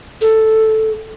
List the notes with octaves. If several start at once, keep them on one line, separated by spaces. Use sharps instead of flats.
A4